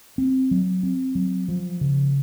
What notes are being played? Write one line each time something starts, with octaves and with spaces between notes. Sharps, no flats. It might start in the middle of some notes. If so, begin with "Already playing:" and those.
C4
F#3
C4
F#3
F3
C#3